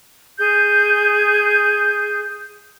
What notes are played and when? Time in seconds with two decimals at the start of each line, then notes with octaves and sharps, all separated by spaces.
0.38 G#4 G6